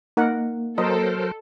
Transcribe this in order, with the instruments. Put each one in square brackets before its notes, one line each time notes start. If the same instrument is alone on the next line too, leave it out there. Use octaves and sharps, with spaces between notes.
[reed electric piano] A#3 [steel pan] D#4 A#4 F#5
[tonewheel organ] F#3 A#4 C5 [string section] A4 [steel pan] D#5